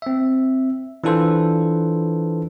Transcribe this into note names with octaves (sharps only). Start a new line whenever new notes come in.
C4 E5
E3 D4 F4 A4 B4 C5